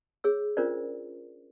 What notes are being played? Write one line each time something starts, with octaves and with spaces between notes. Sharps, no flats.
G#4 C#5 E6
C#4 D4 F4 A#4 C5 D5